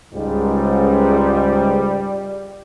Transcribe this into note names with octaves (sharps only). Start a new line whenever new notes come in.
C#2 G#2 G3